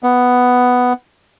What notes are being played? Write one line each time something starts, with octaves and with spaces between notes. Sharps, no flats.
B3